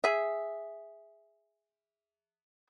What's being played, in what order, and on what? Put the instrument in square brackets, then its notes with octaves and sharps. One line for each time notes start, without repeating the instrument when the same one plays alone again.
[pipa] G#4 E5